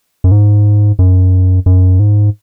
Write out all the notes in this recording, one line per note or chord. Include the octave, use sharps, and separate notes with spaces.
F#2
G#2
F#2
F#2
G#2